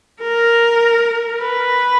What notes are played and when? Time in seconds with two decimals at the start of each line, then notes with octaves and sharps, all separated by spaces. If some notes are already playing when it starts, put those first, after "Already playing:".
0.22 A#4
1.40 B4